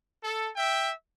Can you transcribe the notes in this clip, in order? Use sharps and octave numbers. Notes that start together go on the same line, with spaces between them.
A4
E5 G5